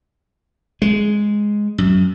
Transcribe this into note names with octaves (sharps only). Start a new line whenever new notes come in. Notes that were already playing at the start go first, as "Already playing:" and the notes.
G#3
F#2